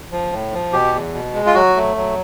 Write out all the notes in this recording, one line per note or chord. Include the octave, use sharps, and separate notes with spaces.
F3
A2
F3
B2 G4
E2
B2
G#3
F4
F#3 F#4
A3
F#3